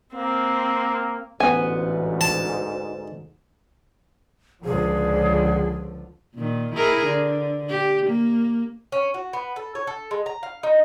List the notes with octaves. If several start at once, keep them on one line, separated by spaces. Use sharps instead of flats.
A#3 C4
A1 D2 G#2 B3 G#5
A5
C#2 D3 F3 G#4
A#2 D#3
E4 G#4 A#4
D3
G4
A#3
C#4
F#4
B3
A4
C#5
A4
G#3
A#5
F5
D#4